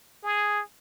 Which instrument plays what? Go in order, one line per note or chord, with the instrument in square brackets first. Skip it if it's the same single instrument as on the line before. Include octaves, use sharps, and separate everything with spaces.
[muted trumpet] G#4